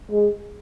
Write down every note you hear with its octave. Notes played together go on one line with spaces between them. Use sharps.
G#3